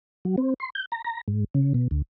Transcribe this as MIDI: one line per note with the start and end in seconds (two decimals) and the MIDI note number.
0.25 0.36 54
0.38 0.54 60
0.60 0.70 84
0.75 0.85 91
0.92 1.02 82
1.05 1.21 82
1.28 1.44 44
1.54 1.73 49
1.74 1.88 47
1.91 2.02 38